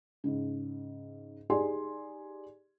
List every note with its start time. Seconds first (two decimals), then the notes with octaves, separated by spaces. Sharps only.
0.24 G#2 C#3
1.50 D#4 G4 G#4 D5 G#5 C6